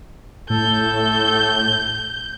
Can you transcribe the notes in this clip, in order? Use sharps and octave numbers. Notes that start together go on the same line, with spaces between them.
A2 A4 G6